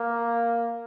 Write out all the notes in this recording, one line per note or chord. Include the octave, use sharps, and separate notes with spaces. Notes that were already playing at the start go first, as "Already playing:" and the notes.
Already playing: A#3